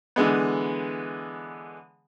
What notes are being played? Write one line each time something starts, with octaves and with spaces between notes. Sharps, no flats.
D3 E3 G#3 B3